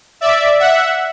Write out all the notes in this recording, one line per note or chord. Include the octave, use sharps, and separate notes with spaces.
D5 E5
E5 F#5